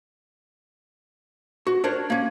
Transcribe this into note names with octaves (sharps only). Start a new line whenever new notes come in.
F#4
D4 A#4 C5 C#5
A#3 C#4